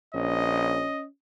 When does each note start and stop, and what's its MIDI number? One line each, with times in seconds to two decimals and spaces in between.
0.14 0.86 34
0.14 1.06 61
0.14 1.04 75